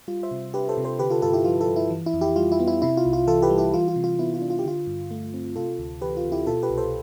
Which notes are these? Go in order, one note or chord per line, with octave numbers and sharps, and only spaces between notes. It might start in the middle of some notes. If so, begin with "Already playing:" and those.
G3 F4
C5 E5
C3
D4 G4 B4
A4 C5
C3
A4 C5
D3 G4 B4
F4 A4
G2 F4 A4
E4 G4
F3 F4
F4 A4
G2
E4
E3
E4
F2
E4 G4
G3 F4
E4
B3
E4
C3 E4
F4
C2
F4
E3 F4 A4
G4 B4
G3
E4 G4
E3 F4
F4
C3
F4
B3 E4
F4
D4
F4
G4
D3 F4
G2
A3
C4
C3 F4 A4
D2
E3 G4 B4
F4
D2
E4 G4
B2 F4 A4
G4 B4
C2
A4 C5